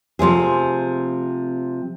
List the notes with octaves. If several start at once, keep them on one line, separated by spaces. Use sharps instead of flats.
C3 F3 A3 G#4